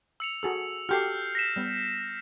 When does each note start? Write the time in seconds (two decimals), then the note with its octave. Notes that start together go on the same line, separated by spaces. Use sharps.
0.20 E6 C#7 F7
0.43 F#4 G#4 A4 E6
0.89 F#4 G4 A4 F6 G6 C7
1.35 A#6 B6 E7
1.56 G3 B3